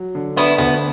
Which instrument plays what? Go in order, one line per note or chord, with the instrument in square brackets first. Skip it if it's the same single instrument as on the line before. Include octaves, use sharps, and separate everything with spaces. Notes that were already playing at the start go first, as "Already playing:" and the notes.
Already playing: [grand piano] F#3
D3
[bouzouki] B3 E4 [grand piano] D4
[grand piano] D2 [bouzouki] B3